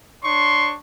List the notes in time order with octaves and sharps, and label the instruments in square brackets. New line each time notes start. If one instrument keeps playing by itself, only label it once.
[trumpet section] D4 C#5 C#6 [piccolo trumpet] C6